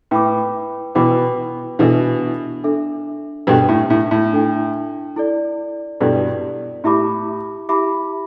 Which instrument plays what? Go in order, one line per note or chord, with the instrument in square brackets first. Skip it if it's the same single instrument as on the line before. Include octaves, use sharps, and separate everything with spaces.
[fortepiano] A2 [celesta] B4 G5 B5 D6
[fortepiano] B2 E3 [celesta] B4 G5 B5 D6
[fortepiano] B2 E3 [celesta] D4 A4 E5
[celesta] D4 A4 E5
[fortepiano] G2 B2 [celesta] D4 A4 G5
[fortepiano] A2
A2
A2
[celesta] D4 A4 G5
E4 A4 D5
[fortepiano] G2 B2 [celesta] E4 A4 D5
[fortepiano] A2 [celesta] E4 G4 E5 B5 D6
[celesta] E4 G4 E5 B5 D6